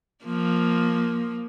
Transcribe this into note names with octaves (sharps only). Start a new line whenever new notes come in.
F3 A#3